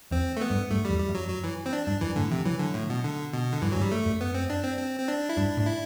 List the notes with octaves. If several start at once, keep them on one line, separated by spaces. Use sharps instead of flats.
E2 C4
A3
B3
G2
G2 A3
E2 G3
G3
F#2
F#3
F#3
E3
C4
D4
G2 D4
F#2 E3
A2 D3
C3 E3
E3 F#3
D3
A2
B2
D3
B2
D3
G2 E3
G2 F#3
G3
A3
F#2
B3
C4
D4
C4
C4
C4
D4
E4
G2 D4
A2
D4
E4